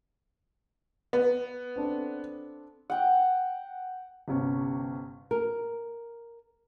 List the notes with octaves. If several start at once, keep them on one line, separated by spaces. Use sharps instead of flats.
B3
C4 D4 A4
F#5 G5
G1 C3 C#4
A#4